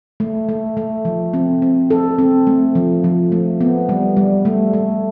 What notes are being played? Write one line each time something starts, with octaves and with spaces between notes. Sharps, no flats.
A3
A3
A3
F3
C4
C4
A4
C4
A3
F3
F3
A3
B3
G3
G3
A3
A3